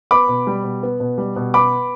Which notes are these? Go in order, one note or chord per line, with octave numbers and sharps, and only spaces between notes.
B3 B5 D6
B2
G3
B2
B3
B2
G3
B2
B3 B5 D6